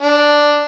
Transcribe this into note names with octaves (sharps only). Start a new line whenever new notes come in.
D4